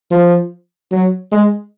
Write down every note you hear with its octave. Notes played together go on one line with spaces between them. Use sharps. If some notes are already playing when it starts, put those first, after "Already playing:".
F3
F#3
G#3